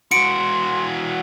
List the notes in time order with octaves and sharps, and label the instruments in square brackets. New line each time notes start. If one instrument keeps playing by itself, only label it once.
[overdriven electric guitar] E3 F#4 [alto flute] C6 [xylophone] C#7 D7